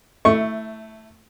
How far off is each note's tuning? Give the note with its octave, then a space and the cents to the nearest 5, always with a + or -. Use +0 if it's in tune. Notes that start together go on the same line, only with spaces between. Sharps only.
A3 +5 E4 -10 C#6 +0